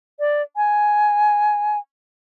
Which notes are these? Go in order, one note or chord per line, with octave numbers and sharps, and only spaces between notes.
D5
G#5